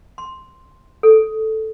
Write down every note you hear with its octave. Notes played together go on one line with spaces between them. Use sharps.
C6
A4